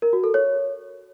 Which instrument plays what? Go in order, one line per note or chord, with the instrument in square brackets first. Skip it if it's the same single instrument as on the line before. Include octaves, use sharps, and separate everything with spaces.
[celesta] A#4
F#4
A4
C#5